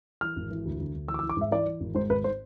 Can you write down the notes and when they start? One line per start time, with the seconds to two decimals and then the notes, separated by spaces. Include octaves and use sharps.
0.21 E3 F6
0.36 G#1
0.51 E3
0.65 D2
0.79 D2
0.94 D2
1.08 E3 E6
1.14 D6
1.19 E6
1.23 E3
1.29 D6
1.37 G#2 E5
1.51 E3 D5
1.66 E3
1.80 G#1
1.95 G#2 C5
2.09 G#1 B4
2.24 C5